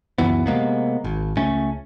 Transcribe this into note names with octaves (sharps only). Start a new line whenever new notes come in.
C#2 F#2 E3 B3
C3 G#3 A#3 B3
G#1
C#2 A3 C#4